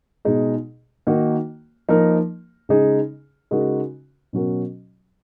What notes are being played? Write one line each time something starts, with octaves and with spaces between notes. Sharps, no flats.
B2 G#3 D#4 G#4
D#3 A#3 D#4 F#4 A#4
F3 A#3 D#4 A#4
C#3 G#3 D#4 G#4
C#3 G#3 D#4 F#4 A#4
B2 F#3 C#4 F#4 A#4